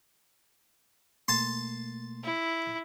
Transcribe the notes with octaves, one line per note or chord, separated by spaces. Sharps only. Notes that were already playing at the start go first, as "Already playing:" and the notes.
B2 A3 A#3 A5 C6
E4